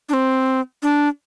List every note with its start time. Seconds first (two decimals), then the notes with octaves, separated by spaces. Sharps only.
0.09 D4
0.13 C4
0.83 D4